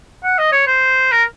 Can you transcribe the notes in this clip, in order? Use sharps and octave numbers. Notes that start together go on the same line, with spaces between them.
F#5
D#5
C#5
C5
A#4